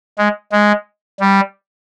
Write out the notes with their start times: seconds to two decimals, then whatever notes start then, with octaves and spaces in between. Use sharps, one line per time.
0.18 G#3
0.52 G#3
1.20 G3